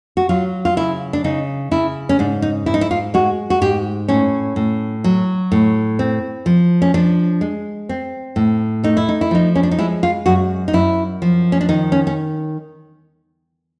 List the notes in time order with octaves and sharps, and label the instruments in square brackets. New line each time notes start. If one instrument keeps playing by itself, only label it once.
[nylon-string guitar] F#4
F#3 F4
F4
C#3 E4
D4
C#3 D#4
C#3 E4
C#4
G#2 D4
D#4
G#2 E4
D#4
E4
F4
G#3 F#4
F#4
G#2 G4
A2 C#4
A2
F#3
A2
C4
F3
C#4
F3 D4
G#3
C4
A2
A3 D#4
E4
D#4
E4
F3 D#4
C#4
D4
D#4
G#3 E4
F4
F#2 F#4
D#4
F#2 E4
F3
C#4
D4
D#3 D#4
C#4
C#4